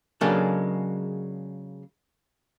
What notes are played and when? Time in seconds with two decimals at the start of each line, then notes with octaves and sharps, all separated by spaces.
0.21 C#3 F#3 G#3 A#3 D4 A4